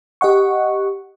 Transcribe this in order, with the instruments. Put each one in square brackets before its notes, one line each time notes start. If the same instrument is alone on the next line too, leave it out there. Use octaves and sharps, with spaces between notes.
[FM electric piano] G4 D#5 F#5 C#6